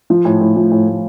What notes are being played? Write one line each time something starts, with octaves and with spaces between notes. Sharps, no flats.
F3
A2
A2
F3
A2
A2